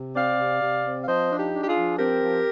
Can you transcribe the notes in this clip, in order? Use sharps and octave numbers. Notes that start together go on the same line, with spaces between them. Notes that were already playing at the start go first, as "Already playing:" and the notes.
Already playing: C3
C4 D5 F5
C3
C3
C4
F5
F3 C5 D#5
D4
D#4 G4
D4
G4
F4 G#4
F3
C4 G4 A#4
F3